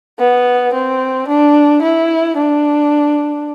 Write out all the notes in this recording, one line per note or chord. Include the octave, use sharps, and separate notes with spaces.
B3
C4
D4
E4
D4